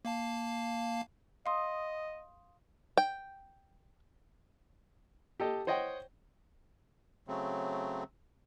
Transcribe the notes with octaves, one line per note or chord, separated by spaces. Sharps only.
A#3 F5 A5
D#5 F5 C6 D#6
G5
G4 A4 D#5
C5 C#5 D#5 F#5 G5
C#3 F#3 A3 C4